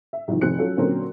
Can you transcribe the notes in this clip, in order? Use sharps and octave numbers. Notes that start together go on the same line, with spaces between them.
E5
C2 D#3 F3
F1 D#3 C4 F#6 C#7
F#3 C#4 F4 A4
A#2 D3 F#3 C4 C#4 A#4